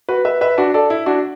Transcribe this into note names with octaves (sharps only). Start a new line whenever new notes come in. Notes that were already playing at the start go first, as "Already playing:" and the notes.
F#4 B4
B4 E5
B4 E5
D4 F#4
A4 D5
E4
D4 F#4